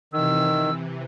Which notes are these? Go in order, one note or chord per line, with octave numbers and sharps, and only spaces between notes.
C3 D#3 E3 E6